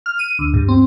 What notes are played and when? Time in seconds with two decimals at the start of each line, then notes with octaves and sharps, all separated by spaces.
0.06 F6
0.19 D#7
0.39 D2
0.54 G2
0.68 C4